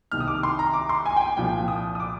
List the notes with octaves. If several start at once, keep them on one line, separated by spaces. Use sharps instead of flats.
C2 C3 D#3 F6
D#6
D6
C6
A#5
D6
C6
G#5
G5
G#5
C2 A#2 F3 G5
D#6
D#6
D6